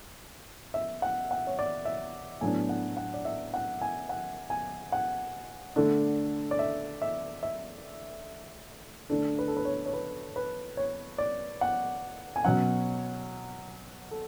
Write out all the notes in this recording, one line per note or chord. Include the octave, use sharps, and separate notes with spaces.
E5
F#5
F#5
C#5
D5
E5
A2 F#3 B3 D4 G#5
F#5
F#5
D5
E5
F#5
G#5
F#5
G#5
F#5
D3 A3 D4
D5
E5
E5
E5
D3 A3 D4 A4
B4
A4
B4
C#5
C#5
B4
B4
C#5
D5
F#5
G#5
B2 F#3 C#4 F#5
A4